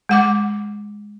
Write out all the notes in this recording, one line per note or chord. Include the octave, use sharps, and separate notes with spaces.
G#3 F#5 D6